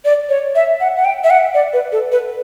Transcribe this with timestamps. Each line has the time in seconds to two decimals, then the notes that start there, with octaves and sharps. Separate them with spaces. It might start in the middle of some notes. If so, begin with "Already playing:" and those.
0.05 D5
0.29 C#5
0.55 E5
0.80 F#5
0.96 F#5
1.05 G5
1.24 E5
1.30 F#5
1.54 D5
1.73 B4
1.92 A4
2.12 B4